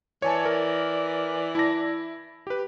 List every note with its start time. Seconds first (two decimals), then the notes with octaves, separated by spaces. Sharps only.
0.22 E3 C#5 D5 G#5 A5
0.45 A#4
1.55 E4 A5 A#6
2.47 G4 B4